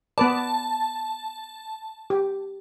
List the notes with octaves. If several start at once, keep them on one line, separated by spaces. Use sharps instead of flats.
B3 B4 D5 A5
G4